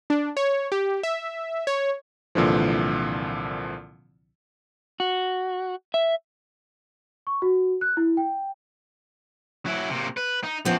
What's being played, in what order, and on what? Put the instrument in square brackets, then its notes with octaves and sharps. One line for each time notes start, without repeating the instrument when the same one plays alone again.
[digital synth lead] D4
C#5
G4
E5
C#5
[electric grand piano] C2 A#2 D3 E3 F3
[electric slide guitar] F#4
E5
[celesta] C#6
F#4
F#6
E4
G5
[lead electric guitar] F#3 E4
C3 A#3
B4
D#4
[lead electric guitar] F#2 C4 [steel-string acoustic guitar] F3 B3